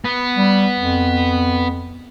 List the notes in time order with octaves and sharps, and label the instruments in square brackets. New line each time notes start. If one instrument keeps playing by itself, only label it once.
[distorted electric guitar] B3
[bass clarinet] G3
F2